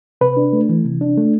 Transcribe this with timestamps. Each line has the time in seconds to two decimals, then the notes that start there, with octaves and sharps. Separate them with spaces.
0.21 C3 B4
0.37 D4
0.53 A3
0.69 E3
0.85 C3
1.01 D4
1.18 A3